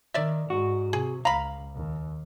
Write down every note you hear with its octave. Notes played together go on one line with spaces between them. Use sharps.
D#3 D5 E5
G#2 F#4
C3 G#4
C#2 F5 A#5 B5
D#2